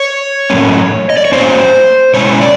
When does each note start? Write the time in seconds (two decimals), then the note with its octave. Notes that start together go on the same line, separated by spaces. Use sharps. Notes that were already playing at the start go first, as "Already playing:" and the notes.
Already playing: C#5
0.50 A2 F#3 A#3 C#4
1.10 D#5
1.17 D5
1.25 C#5
1.32 A2 F#3 A#3 C#4 C5
2.14 B2 G#3 C#4 E4 C#5
2.41 D5